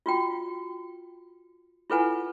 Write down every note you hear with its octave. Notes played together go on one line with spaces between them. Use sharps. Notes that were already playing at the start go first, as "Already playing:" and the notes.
F4 F#4 G5
E4 F4 A4 B4 F#5 G#5